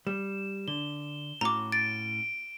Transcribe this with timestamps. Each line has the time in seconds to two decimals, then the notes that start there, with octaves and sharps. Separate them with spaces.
0.07 G3 E7
0.68 D3 G7
1.41 A2 C#4 F#4 A#5 D6
1.72 A6 D7